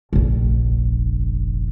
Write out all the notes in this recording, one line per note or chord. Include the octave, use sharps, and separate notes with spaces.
F1 A#1